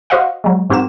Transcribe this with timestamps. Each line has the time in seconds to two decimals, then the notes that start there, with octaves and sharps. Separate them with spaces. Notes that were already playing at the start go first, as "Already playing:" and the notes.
0.10 F#4 C5 D#5 F5 F#5
0.44 F#3 G#3
0.70 G#2 C4 F#4 G4 A#4 E7